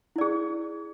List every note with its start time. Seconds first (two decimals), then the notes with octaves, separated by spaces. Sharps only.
0.16 E4
0.18 D5
0.21 G#4